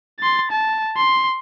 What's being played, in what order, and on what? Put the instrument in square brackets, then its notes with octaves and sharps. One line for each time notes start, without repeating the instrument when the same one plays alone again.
[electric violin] C6 A6
A5
C6